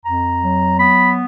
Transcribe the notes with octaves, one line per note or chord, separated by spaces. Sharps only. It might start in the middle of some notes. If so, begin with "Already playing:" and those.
F2 A#5
F#3
B3 B5